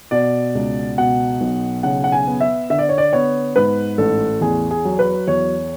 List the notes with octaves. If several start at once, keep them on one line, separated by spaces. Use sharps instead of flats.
B2 D5
C#2
B2 F#5
B1
C#3 F#5
F#5
G#5
B3
E5
D3 E5
D5
C#5
D5
B3 C#5
G#2 B4
A1 A4
E2 G#4
G#4
F#3
B4
E2 C#5